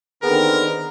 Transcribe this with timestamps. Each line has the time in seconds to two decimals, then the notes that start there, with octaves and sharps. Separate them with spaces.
0.23 D3 D#3 B3 C4 G#4 A#4 B4